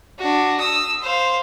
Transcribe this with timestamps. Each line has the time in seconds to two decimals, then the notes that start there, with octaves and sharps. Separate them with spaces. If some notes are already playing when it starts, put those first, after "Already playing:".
0.19 D4 F#4
0.60 D#6 E6
1.01 C5 F5